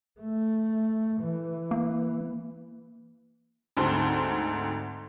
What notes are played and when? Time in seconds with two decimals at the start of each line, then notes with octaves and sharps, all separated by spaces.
0.21 A3
1.21 E3
1.71 A#3
3.77 D2 G#2 C4 A5 C6